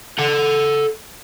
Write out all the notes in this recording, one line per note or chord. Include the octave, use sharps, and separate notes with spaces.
A4 F#5